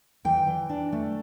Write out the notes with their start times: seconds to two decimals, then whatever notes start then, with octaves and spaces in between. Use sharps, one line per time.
0.25 E3 G5
0.47 E3
0.69 D4
0.92 A3